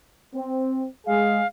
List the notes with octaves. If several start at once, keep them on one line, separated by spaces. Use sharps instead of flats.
C4
G#3 G#4 F5